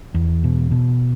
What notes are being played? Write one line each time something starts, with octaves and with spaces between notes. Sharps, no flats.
E2
B2
B2